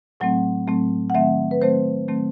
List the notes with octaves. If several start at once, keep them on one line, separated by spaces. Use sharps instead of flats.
A2 F#3 A3 C4 F#5
A2 F#3 A3 C4
F#5
D#3 F#3 A3 C4 E5
B4
D#3 F#3 A3 C4 C5
D#3 F#3 A3 C4